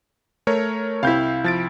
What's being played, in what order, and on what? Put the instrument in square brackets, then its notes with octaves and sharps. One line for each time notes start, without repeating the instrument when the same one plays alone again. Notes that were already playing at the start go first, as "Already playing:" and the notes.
[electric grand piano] A3 A#4 C#5
[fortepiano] C2 E4 [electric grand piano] F5 G6
[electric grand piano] F3 A6 D7